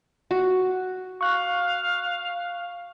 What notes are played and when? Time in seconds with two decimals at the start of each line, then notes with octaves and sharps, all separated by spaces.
0.31 F#4
1.21 F5 C#6 F#6